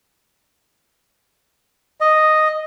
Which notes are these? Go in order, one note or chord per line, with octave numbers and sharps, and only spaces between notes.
D#5